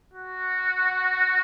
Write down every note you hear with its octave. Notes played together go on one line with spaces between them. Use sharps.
F#4